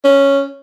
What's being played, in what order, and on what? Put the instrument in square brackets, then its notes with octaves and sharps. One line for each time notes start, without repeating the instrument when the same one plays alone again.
[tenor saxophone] C#4